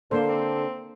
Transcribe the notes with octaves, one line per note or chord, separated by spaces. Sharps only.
D3 A#3 D4 A4 C5
C4